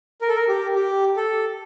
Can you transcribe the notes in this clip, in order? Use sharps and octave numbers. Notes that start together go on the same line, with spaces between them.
A#4
A4
A#4
G4
G4
A4